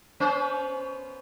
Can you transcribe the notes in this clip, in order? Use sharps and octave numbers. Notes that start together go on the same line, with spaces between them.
B3 C#4 C5